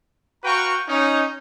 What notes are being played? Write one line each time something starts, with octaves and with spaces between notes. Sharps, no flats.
F#4 B4 F5 G5 A#5 C#6
C#4 D#4